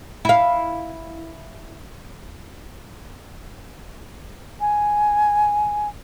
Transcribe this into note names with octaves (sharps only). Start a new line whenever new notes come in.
E4 F5
G#5